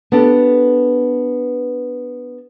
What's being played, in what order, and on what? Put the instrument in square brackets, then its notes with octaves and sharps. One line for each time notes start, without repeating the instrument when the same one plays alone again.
[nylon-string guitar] B3 D4 G4 A4